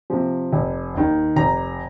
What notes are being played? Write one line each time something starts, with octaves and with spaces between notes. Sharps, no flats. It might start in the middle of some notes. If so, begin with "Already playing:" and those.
C3 F3
F1
D#2 D#3
F1 A#5